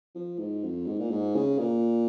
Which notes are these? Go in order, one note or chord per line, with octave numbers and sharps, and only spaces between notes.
F3
G#2
F2
G#2
A#2
G#2
C#3
A#2